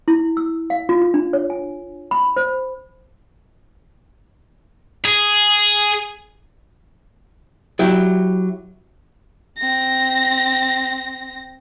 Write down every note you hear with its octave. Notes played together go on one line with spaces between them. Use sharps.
E4
E6
F5
F4
F4
D4
C#5
G#5
B5
C5
G#4
F#3 E4 G4
C4 A#6